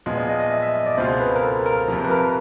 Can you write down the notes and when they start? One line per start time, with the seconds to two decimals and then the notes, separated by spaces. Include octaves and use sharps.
0.06 A#2 F3 G#3 B3 D#5
0.17 D5
0.29 D#5
0.40 D#5
0.52 E5
0.62 E5
0.75 D#5
0.86 D5
0.97 C#2 B2 G#3 C4 F4 C5
1.20 B4
1.36 A#4
1.43 A4
1.66 A#4
1.88 F2 C3 F3
2.04 B4
2.10 A#4